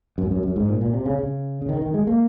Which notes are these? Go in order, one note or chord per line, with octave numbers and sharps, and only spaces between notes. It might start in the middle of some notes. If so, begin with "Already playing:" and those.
F#2
G#2
F#2
F#2
G#2
A#2
A#2
C3
C#3
C#3
C#3
D#3
D#3
G#3
A#3